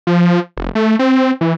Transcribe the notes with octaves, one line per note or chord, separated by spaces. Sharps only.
F3
F1
A3
C4
E3